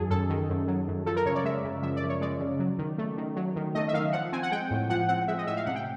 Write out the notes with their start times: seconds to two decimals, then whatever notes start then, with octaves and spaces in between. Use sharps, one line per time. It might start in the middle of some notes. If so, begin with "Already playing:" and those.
Already playing: F#2 D#3 F#3 G#4 A4
0.10 F#2 A4
0.30 D#3
0.50 F#2
0.68 F#3
0.88 F#2
1.06 F3 A4
1.16 A#4
1.26 C#3 C#5
1.35 D5
1.44 G#3 E5
1.64 C#3
1.83 F3 E5
1.97 D5
2.02 C#3
2.09 C#5
2.21 G#3 D5
2.40 C#3
2.59 F#3
2.78 D#3
2.98 A3
3.17 D#3
3.36 F#3
3.56 D#3
3.75 A3 D#5
3.88 E5
3.93 D#3 F5
4.13 F3 F#5
4.32 C4 G#5
4.43 F#5
4.51 G#3 G5
4.71 A2
4.90 F3 F#5
5.08 C4 F#5
5.28 G#3 E5
5.38 D#5
5.47 A2 E5
5.57 F5
5.66 C3 F#5
5.76 G5